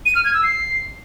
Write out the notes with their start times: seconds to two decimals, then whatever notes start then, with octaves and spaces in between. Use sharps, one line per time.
0.06 D#7
0.15 F6
0.25 G#6
0.34 E6
0.43 C7